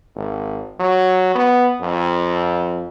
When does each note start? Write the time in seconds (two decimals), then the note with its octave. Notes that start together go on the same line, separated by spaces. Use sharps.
0.16 G#1
0.80 F#3
1.35 B3
1.82 F2